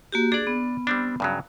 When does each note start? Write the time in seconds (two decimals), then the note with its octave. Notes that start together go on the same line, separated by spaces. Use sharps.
0.12 A#3 F#4 G4
0.32 D4 G#4 D5
0.47 B3
0.87 G3 C4 D4
1.20 G2 C#3 F#3